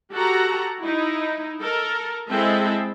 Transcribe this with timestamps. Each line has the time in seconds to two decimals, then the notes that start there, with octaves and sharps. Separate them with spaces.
0.13 F#4 G4 A4 F#5 A#5
0.81 D#4 E4
1.62 A4 A#4
2.30 G#3 C4 E4 G#4 A4 E5